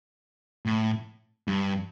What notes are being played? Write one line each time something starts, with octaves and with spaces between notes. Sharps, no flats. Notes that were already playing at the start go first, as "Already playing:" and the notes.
A2
G2